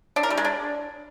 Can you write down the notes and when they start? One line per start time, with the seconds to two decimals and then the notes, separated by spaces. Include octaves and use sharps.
0.16 D4
0.23 A#4
0.30 G3
0.37 G#3
0.45 D4